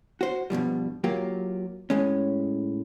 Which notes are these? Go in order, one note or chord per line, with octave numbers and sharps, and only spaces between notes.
F#4 C5
G2 B2 F3 G3
F#3 A#3 F4 G4
A2 G#3 C#4